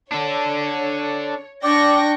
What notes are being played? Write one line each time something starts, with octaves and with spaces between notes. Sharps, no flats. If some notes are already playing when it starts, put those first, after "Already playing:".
D4 A4 C#5
D4 D5 G5 C#6 A#6